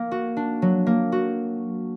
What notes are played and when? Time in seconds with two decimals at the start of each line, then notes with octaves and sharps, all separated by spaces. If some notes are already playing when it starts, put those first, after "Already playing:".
Already playing: A#3
0.11 F#4
0.37 D4
0.62 F#3
0.86 A#3
1.12 F#4